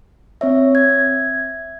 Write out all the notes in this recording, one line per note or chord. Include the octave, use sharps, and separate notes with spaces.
C4 C#5 E5
E5 G#6